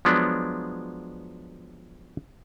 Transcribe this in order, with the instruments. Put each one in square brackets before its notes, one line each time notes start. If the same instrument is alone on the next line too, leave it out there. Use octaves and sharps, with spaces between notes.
[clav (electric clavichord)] F3 F#3 G#3 B3 D4